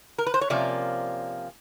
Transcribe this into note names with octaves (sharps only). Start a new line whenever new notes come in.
A#4
B4
C5
C#5
C3 F3 A#3 C#4 D5